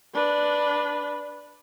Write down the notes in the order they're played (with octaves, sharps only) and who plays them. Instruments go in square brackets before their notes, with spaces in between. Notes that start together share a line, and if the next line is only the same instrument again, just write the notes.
[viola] D4 B4